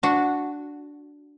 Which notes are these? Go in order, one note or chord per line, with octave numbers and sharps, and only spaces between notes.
D4 F#4